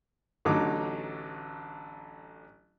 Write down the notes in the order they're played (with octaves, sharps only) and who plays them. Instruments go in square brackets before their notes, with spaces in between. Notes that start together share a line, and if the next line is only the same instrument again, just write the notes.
[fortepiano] A1 D3 F#3 D#4 D6